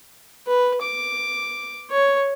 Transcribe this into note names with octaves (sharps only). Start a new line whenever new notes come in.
B4
D6
C#5